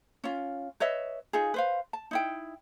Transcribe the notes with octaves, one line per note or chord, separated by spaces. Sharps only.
C#4 F4
B4 C#5 D#5 E5
D#4 F4 G#4
B4 C5 F5
A5
D#4 E4 G5